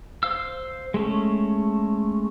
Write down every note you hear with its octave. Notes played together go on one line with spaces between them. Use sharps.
C5 F5 E6
G#3 A3 C#4